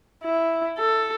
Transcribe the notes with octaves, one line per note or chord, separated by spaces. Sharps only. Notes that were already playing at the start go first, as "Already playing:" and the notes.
E4
A4